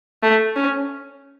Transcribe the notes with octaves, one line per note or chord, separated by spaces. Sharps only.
A3
C#4